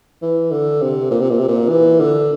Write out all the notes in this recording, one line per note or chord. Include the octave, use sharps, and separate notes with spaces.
E3
D3
C3
A#2
C3
A#2
C3
A#2
E3
D3